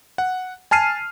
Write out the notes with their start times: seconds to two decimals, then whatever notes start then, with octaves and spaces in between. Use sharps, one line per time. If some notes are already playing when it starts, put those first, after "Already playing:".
0.18 F#5
0.71 G#5 A5 F6 C7 D#7